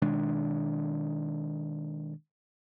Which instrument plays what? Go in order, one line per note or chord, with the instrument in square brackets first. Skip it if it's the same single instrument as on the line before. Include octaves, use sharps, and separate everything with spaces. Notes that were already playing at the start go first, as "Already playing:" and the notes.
[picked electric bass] B2 D#3 G#3 D4